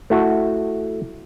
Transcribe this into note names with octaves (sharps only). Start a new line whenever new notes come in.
A3 E4 F#4